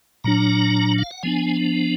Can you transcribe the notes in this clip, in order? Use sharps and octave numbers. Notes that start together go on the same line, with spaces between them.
A#2 F#3 D4 A#5
F5
F#5
F3 B3 D4 G#5